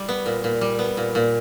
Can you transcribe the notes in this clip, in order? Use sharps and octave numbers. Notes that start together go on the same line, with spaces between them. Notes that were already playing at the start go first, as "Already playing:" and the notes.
Already playing: G3
B3
A#2
A#2
G3
B3
A#2
A#2